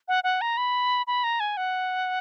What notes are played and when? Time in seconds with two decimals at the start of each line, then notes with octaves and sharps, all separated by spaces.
0.08 F#5
0.24 F#5
0.41 A#5
0.57 B5
1.07 B5
1.24 A#5
1.40 G#5
1.57 F#5